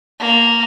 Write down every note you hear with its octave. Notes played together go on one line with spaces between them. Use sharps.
A#3